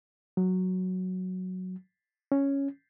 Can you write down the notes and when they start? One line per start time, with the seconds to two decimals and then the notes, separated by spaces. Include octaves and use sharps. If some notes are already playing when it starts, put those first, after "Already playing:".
0.37 F#3
2.32 C#4